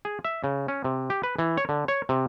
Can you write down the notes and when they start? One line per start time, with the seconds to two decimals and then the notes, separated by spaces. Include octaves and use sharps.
0.05 G#4
0.25 E5
0.44 C#3
0.68 C#4
0.84 C3
1.10 G4
1.23 B4
1.39 E3
1.57 C#5
1.69 D3
1.88 C#5
2.09 C3